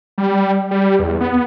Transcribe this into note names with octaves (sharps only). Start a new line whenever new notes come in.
G3
G3
E2
B3